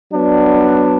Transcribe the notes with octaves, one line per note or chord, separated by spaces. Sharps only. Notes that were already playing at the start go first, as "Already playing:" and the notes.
F#3 B3 D4